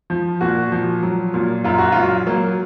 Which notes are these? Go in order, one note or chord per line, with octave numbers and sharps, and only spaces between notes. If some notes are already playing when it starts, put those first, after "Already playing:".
F3
A#2 F#4
F3
F#3
A#2
F#2 F4
F#4
F#3 F4
F#3 A#3